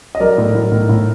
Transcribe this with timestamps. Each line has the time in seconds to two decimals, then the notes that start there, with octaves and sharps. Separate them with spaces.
0.15 D#5
0.20 F#3 A#4 D5
0.38 A2
0.55 A2
0.72 A2
0.89 A2